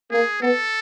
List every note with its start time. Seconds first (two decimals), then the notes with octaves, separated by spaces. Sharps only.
0.11 A#3 G#4
0.42 B3 A4